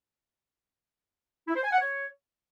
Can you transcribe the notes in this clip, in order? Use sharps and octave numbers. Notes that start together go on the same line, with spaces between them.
E4
C5
G#5
F#5
C#5